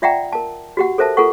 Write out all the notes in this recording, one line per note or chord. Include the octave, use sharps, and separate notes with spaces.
F4 D5 E5 F#5 G5 A#5
A#4 A5
F#4 G4 F#5
A4 A#4 C5 E5 A5
F4 A4 A#4 F#5 C#6